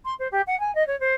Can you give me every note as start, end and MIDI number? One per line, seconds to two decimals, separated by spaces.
0.05 0.14 84
0.19 0.28 72
0.32 0.41 67
0.47 0.58 78
0.60 0.73 80
0.75 0.86 75
0.87 0.98 73
1.00 1.15 72